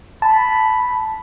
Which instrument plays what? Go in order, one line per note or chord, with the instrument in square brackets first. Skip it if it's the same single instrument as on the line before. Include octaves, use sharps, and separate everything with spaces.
[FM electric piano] A5 [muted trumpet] B5